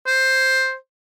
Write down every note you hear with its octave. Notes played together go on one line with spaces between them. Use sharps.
C5